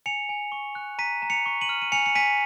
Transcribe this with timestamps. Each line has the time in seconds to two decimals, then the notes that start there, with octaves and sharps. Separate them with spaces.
0.06 G#5 C#7 F7
0.29 G#5
0.52 C#6
0.75 F#6
0.99 A#5 B6 D#7
1.22 A#5
1.30 C#7 F7
1.46 C#6
1.61 D#7 F#7
1.69 F6
1.82 D#7
1.92 G#5 C#7 F7
2.06 C#7
2.15 G#5 B6 D#7